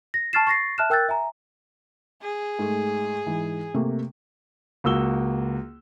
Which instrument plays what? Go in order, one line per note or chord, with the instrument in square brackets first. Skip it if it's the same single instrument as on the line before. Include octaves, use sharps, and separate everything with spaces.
[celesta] A#6
A5 C#6 F6 A6 C7 E7
C#6 A6 A#6 C7
E5 A5 F6 F#6 E7
A#4 G5 E6 F#6 G6 A6
E5 G#5 A#5
[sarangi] G#4
[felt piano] G#2 A3
G#2 E3
C3 A3 A#3
[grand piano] C#2 A#3 F#4 E6 G7